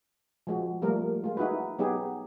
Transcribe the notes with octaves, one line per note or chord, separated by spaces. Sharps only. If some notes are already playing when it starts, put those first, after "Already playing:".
F3 G#3 F#4
F3 G3 A3 A#3 A#4
G#3 F4
D#4 E4 F#4 G#4 B4
F#3 B3 D#4 G4 G#4